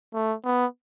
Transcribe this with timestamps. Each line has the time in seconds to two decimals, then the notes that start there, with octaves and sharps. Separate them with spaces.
0.14 A3
0.44 B3